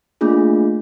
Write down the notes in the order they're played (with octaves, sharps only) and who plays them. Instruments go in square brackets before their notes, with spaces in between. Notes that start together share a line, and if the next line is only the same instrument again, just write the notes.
[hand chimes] A3 A#3 D4 F4 G#4